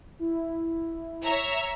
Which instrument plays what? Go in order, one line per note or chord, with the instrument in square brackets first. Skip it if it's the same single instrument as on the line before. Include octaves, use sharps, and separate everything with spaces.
[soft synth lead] E4
[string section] C#5 E5 A#5